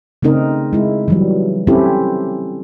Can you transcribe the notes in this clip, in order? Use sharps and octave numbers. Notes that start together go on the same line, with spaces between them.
C#3 A3 C4 D#4 A#4 D#5
G#3 E4
E3 F#3 G3
C4 C#4 E4 G4 A4